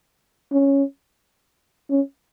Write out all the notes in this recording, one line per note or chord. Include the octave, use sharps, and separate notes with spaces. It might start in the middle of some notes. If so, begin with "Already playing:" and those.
C#4
C#4